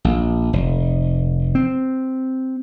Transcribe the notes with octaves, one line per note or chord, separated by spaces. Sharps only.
A#1
F1
C4